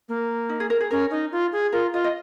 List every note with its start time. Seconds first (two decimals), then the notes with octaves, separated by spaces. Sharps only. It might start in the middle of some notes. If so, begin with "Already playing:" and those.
0.09 A#3
0.49 D#4
0.60 G#4
0.70 A#4
0.80 G#4
0.91 C#4 A#4
1.11 D#4
1.32 F4
1.52 G#4
1.72 F4 A#4
1.93 F4 D#5
2.04 D#5